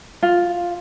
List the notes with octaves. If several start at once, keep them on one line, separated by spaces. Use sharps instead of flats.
F4